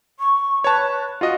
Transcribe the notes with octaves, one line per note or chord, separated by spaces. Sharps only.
C#6
B4 C#5 A5
F4 F#4 D#5